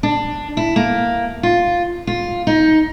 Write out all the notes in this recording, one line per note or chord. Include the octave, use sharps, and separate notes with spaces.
D4
E4
A#3
F4
F4
D#4